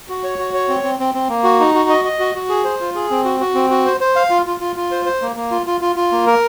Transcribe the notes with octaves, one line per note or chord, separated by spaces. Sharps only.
F#4
C#5
F#4
C#5
C4
C4
C4
C4
A#3
F#4
D#4
F#4
D#5
D#5
F#4
F#4
G#4
C5
F4
G#4
C4
F#4
F#4
C4
F#4
C5
C5
F5
F4
F4
F4
F4
C5
C5
A#3
A#3
F4
F4
F4
F4
A#3
A#4